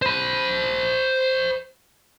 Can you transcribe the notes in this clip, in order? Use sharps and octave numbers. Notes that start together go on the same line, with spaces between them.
C5 B5